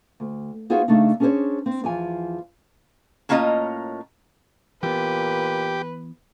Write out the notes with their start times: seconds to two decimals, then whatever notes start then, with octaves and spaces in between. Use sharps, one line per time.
0.20 D2
0.70 B3 D#4 F4 F#4 G#4 C5
0.88 C#3 A3 D4 D#4
1.20 C#4 D4 G#4 A#4 C5 C#5
1.66 C4
1.84 E2 F3 G#5
3.29 A2 A#3 C#4 F4 D#5 A#5
4.83 A#2 E3 B3 G4 B4